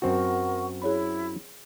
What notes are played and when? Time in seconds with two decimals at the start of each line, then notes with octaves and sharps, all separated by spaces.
0.02 F#2 C4 F#4 A#4 F#5 C#6
0.82 E4 G#4 C#5 B5